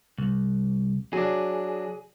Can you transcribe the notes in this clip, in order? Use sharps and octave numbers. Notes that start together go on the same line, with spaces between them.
C2
F#3 D4 G#4